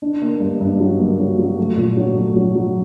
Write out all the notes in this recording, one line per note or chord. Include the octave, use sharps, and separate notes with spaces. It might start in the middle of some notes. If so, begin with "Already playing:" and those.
D4
A#3
G2
G2
F#3
A#3
F#3
F#3
A3
A#2
F#3
A3
F#3
F#3